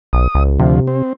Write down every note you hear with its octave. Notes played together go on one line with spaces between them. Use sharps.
B1 D#6
C#2
D2 C3 F3
C4